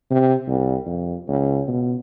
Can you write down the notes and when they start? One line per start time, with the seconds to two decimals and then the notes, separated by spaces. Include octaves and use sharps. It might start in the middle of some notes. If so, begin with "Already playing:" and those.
0.11 C3
0.47 C2
0.86 F2
1.28 C#2
1.68 B2